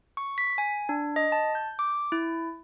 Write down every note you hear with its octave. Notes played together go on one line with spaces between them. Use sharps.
C#6
B6
G#5
D4
D#5
A5
G6
D6
E4